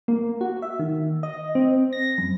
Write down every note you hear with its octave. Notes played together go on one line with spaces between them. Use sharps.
A#3
F#4
E5
D#3
D#5
C4
A#6
F#2